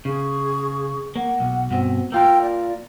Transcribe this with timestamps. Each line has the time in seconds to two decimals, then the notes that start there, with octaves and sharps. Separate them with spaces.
0.05 C#3 G#4 C#6
1.16 A#3 F#5
1.40 B1
1.71 G2 B2 C4
2.12 A#3 F4 A#4 G5 E6 G6
2.41 D5